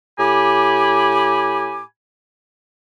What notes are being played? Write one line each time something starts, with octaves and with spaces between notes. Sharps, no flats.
A2 G4 G#5 B5 D6